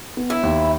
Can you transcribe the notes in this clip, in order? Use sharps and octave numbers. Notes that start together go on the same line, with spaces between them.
B3
E4
D#2